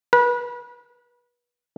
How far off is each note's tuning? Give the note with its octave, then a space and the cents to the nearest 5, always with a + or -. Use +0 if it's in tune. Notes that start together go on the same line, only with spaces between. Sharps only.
B4 -30